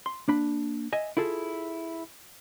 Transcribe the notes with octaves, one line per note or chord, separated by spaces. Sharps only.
C6
A#3 D4 B5
D#5 E5 G#5
E4 F4 G#4 A4